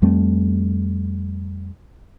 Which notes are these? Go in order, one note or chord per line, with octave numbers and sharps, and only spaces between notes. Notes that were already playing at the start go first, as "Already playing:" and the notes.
F2 G3 A3 C4